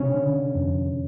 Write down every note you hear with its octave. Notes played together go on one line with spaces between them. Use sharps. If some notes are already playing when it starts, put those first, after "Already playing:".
Already playing: C3 C#4
D3
F2